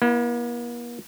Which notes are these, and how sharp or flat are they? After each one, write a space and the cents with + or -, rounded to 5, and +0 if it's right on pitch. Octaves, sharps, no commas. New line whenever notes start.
A#3 +45 E4 +5